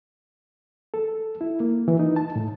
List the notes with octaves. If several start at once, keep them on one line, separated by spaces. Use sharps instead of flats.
A4
E4
A#3
E3
D#4
A5
A2